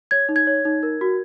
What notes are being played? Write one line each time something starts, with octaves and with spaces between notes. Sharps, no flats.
C#5 G#6
D#4
G#6
C#5
D#4
A#4
F#4